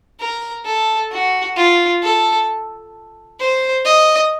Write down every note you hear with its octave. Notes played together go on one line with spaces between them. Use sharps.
A#4
A4
F#4
F4
A4
C5
D#5